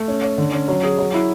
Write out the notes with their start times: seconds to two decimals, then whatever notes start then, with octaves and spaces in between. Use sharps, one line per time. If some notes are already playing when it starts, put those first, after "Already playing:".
Already playing: A3
0.08 C#4
0.23 C#5
0.38 D3
0.53 C#4
0.68 F#3
0.83 G#4
0.98 F#3
1.14 E4